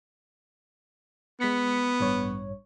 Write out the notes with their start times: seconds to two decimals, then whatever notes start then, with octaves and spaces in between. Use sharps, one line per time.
1.40 G#3 B3 B6 C#7
2.00 A1 G2 C#5